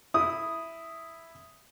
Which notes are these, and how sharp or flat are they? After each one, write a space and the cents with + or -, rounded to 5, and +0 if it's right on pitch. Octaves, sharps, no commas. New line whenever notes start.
E4 +0 D#6 +0